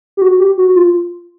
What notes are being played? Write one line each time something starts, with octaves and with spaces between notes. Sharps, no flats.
G4
F#4
G4
F#4
F4